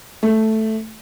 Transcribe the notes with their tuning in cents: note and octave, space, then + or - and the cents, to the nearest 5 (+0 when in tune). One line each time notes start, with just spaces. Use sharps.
A3 +0